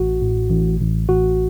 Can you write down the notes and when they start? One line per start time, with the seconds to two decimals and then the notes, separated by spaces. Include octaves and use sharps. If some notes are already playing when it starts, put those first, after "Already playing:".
Already playing: A1 F#4
0.21 A2
0.50 A1
0.80 A1
1.09 A1 F#4